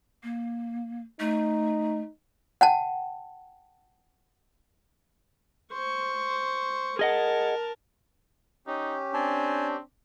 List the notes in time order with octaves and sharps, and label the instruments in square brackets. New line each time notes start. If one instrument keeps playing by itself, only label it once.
[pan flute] A#3
[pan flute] A3 [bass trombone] D#4
[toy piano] F#5 G5 A5
[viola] C5 C#6
[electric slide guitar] G#4 D#5 F#5 [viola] A#4 A5
[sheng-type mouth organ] C#4 G4 [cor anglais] D#4
[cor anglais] C4 [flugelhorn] D4 [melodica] G#5 A5